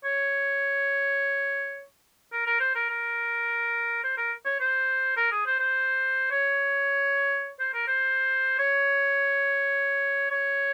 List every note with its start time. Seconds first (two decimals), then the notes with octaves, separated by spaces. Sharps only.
0.05 C#5
2.32 A#4
2.47 A#4
2.60 C5
2.75 A#4
2.90 A#4
4.04 C5
4.17 A#4
4.45 C#5
4.60 C5
5.17 A#4
5.32 G#4
5.46 C5
5.60 C5
6.31 C#5
7.60 C5
7.74 A#4
7.88 C5
8.59 C#5
10.31 C#5